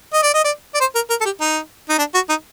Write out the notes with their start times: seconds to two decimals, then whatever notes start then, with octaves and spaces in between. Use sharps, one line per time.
0.13 D#5
0.23 D5
0.34 D#5
0.44 D5
0.75 D5
0.80 C5
0.95 A#4
1.10 A#4
1.21 A4
1.25 G4
1.40 D#4
1.89 D#4
1.98 D4
2.14 F#4
2.29 D#4